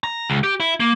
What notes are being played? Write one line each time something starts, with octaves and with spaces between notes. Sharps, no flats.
A#5
C#2
G4
E4
A#3